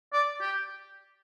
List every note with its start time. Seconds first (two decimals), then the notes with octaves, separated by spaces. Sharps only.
0.13 D5
0.41 G4